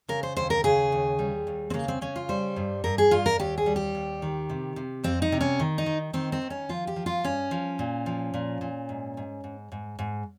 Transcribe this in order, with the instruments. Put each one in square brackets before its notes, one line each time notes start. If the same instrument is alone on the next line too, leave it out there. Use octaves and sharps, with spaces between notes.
[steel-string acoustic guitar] C#3 A#4
C5
D#2 C5
A#4
C#3 G#4
D#2
G3
D#2
C4
C#3 A#3
C4
C#3 C#4
F4
G3 C5
G2
G2 A#4
G#4
G2 F4
A#4
D#2 G4
G#4
G3
G4
D#2
D#3
C3
C3
F2 C4
D#4
C3
C#4
D#3
D#4
D#3
D#3 C4
C4
D#3
C#4
F3 F4
G4
F3
F4
G2 C#4
F3
A#2
F3
A#2
A#2
G#2
G#2
G#2
G#2
G#2